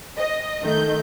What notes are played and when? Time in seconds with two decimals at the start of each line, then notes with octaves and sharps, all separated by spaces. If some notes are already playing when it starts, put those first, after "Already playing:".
0.18 D#5
0.63 D#3 A3 G6